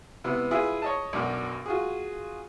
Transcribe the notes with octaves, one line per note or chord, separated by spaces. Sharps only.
C3 B3 E4
E4 F4 G#4 B4 E5
C#5 D#5 A5
B1 F#2 D4 F6
F4 F#4 G#4